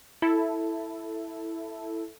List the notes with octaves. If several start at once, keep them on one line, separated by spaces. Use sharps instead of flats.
E4 A4